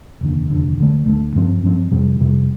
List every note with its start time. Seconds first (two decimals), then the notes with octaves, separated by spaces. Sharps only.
0.21 F1 D#2 D3
0.49 F1 D#2 D3
0.78 D2 D3 A3
1.06 D2 D3 A3
1.35 G2 F3 C4
1.63 G2 F3 C4
1.91 F2 C3 G3
2.19 F2 C3 G3